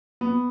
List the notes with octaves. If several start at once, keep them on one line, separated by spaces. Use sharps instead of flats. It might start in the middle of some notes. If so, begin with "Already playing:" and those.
B3